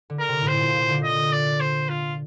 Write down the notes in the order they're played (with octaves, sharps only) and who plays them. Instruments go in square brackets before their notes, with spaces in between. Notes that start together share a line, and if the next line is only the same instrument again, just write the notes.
[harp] D3
[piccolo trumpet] A#4
[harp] C3
A2
[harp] A#2 [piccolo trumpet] C5
[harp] A#2
A#2
D3
[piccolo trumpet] D#5
D5
C5
F4